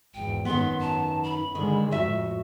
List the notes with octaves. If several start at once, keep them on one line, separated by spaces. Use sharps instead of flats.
G#1 E2 G5
F#2 D#3 B3 C6
A5
B5
D3 D#3 G#3
F2 A2 F#4 E5